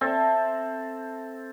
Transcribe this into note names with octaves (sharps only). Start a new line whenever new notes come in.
C4 A4 E5 A5